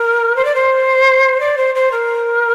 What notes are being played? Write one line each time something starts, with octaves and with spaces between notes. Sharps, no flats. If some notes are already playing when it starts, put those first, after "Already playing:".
Already playing: A#4
C5
D5
C5
D5
C5
C5
A#4